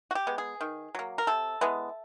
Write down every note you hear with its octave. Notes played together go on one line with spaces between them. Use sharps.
F#4
G4
G#3 B3
G#4
D#3
F#3 A#3
A#4
C3 A4
E3 G#3 B3